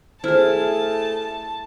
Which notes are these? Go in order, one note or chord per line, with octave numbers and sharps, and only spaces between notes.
A3 E4 G#4 C5 A5 F6